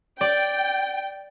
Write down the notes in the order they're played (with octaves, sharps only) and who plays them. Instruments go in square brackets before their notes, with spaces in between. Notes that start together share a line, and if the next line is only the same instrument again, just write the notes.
[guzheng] D5 [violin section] G5